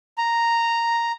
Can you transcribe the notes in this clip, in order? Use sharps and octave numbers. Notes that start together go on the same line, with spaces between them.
A#5